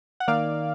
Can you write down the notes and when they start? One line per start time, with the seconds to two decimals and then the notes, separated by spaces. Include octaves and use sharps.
0.20 F#5
0.28 D#3 A#3 D5 F5